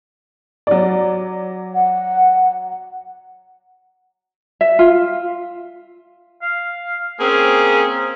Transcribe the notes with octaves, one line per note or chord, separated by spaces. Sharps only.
F#3 D5
F#5
E5
F4
F5
A#3 C4 C#4 G#4